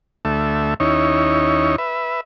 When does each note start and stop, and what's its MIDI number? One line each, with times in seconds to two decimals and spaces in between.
0.25 0.74 38
0.25 0.74 57
0.25 0.74 76
0.80 1.76 39
0.80 1.76 61
0.80 1.76 63
0.80 1.76 64
0.80 1.76 73
1.78 2.21 71
1.78 2.21 76